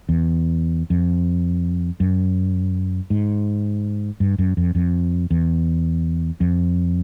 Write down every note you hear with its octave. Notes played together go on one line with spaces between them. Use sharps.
E2
F2
F#2
G#2
G2
F#2
F2
F2
E2
F2